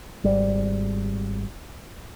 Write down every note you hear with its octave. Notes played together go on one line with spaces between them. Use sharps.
G#1 G3